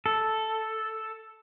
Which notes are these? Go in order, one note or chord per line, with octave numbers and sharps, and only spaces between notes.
A4